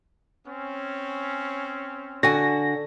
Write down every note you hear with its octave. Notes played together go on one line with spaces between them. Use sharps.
C4 C#4
D3 F#4 G#5 A#6